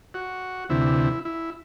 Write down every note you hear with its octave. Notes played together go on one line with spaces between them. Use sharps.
F#4
D2 C3 E3 E4
E4